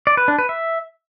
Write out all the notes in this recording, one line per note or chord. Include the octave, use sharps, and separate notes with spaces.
D5
B4
D4
B4
E5